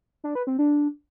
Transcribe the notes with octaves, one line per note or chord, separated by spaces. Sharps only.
D4
B4
C4
D4